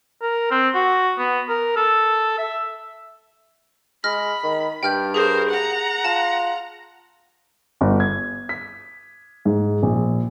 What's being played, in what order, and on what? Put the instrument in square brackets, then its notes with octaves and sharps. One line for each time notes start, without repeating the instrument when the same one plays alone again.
[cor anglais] A#4
C4
F#4
B3
A#4
A4
E5
[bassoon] G#3 [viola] B5 [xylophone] F6 A#6
[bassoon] D#3
[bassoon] G2 [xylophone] G5 F6 G6
[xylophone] G#4 [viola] A#4 C5
[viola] F#5 A#5
[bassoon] F4 [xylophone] A5
[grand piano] G1
G#6
B6
G#2
A#1